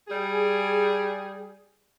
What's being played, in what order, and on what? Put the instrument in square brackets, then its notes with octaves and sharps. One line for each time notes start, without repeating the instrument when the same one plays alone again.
[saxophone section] G3 G#4